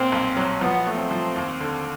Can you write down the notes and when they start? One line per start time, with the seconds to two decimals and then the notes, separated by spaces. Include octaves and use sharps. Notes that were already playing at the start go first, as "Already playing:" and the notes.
Already playing: A#2 C4
0.12 B1
0.37 F#3
0.61 F3 B3
0.87 A3
0.99 C4
1.11 F3
1.36 D#2
1.61 D3